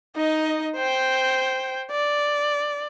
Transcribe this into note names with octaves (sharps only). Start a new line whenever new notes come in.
D#4 D#5
C5 G5
D5